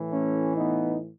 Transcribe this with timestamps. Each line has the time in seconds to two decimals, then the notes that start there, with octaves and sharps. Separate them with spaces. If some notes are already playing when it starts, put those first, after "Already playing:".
Already playing: A2 E3
0.11 A3 C#4
0.57 B3 D#4